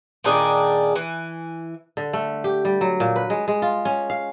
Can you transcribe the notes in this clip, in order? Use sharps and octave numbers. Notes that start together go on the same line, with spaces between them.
A#2 D#3 D4 G#4
E3
D3
A3
G4
G3
F#3
A#2
B4
G#3
G#3
F4
C#4
F5